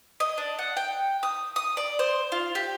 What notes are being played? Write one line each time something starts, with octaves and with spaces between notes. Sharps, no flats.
D#5
D4
F#5
G5
D#6
D#6
D5
C5
F4
G4